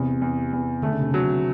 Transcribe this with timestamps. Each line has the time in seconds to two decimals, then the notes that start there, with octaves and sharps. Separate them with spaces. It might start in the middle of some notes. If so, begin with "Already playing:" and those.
Already playing: E2 C3
0.21 E2
0.53 E2
0.82 D3 A3
0.93 C#3
1.02 C3
1.11 C#3 F#3